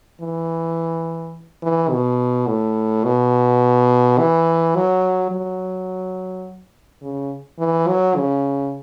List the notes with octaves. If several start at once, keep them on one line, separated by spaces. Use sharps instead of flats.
E3
E3
B2
A2
B2
E3
F#3
F#3
C#3
E3
F#3
C#3